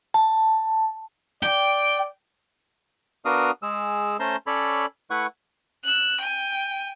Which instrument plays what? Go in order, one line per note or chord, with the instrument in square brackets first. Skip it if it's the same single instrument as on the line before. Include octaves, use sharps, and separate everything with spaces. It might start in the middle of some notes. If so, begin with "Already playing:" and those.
[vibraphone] A5
[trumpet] D5 [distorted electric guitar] G5
[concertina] B3 D4 F#4 A#4 F5 D#6
G#3 G#4 E6
A3 C#4 C5 A5 A#5 C6
C#4 A4 C#5 D5 B5
A3 E4 B4 F#5 C#6
[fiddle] E6 F#6
G5 G#5